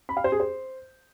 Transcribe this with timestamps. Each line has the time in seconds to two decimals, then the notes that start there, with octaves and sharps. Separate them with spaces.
0.09 B5
0.17 F5
0.24 C5
0.32 G#4
0.40 C5